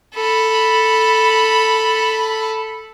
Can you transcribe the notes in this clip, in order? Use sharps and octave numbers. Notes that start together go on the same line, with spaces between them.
A4 B5